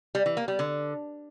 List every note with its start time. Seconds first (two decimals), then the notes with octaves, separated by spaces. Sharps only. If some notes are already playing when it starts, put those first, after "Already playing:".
0.15 G3
0.26 E3
0.37 A#3
0.48 G3
0.59 D3